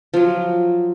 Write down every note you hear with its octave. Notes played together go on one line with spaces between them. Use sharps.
F3 F#3